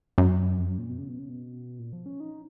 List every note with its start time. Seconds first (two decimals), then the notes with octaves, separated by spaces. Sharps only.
0.18 F#2
0.59 F2
0.69 F#2
0.78 A#2
0.89 B2
0.98 C#3
1.09 B2
1.19 C#3
1.29 B2
1.79 A#2
1.93 F3
2.06 C#4
2.20 D#4